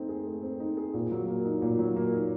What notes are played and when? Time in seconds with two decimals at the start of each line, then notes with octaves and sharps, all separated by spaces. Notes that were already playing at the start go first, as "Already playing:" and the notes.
Already playing: A3 C4 D#4
0.09 G#4
0.27 A3
0.43 C4
0.60 D#4
0.77 G#4
0.94 A#2
1.12 F#3
1.28 A#3
1.45 D#4
1.62 A#2
1.79 F#3
1.96 A#3
2.13 D#4